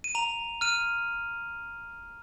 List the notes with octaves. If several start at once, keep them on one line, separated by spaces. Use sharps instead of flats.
D#7
A#5 F7
F6 D#7